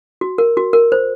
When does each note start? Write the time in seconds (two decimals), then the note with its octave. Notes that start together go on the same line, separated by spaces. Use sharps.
0.21 F#4
0.38 A#4
0.57 F#4
0.73 A#4
0.92 C5